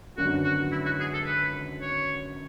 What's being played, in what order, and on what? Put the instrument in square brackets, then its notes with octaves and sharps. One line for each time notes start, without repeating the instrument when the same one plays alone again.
[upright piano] G#1 F#2 D3 F#3 B3 [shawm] F#4
[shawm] F#4
E4
F#4
G#4
A4
B4
C#5